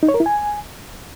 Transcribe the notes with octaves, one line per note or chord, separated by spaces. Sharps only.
D#4
C#5
A#4
E4
G#5